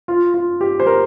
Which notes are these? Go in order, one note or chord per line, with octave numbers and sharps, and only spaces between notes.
F4
F4
G4
C5
A#4